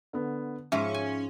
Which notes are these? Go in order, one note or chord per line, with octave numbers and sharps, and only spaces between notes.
D3 B3
G#2 F3 C#4 E5
G#5